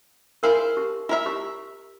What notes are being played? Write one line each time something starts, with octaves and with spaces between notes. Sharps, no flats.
E4 G#4 A#4 C5 F5
G4
E4 F4 A#4 E5
G4